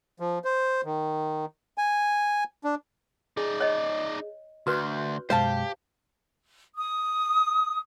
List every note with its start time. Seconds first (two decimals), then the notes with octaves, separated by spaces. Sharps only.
0.20 F3
0.44 C5
0.84 D#3
1.78 G#5
2.64 D4
3.37 D#4 G#4 D5
3.60 C#5 D#5
4.67 D2 F#4 B4 C6 F#6 G6
5.30 F#2 B2 G#3 G4 C5 F5 A5
6.77 D#6